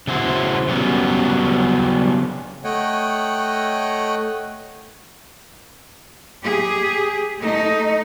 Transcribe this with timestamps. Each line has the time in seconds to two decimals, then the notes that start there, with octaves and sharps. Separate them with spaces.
0.07 C#3 D4 E4 F#4 C5
0.68 C#3 F#3 G3 A#3 B3 C#4
2.64 A3 C#5 D#5 F#5 G5
6.43 G4 G#4
7.38 A3 D#4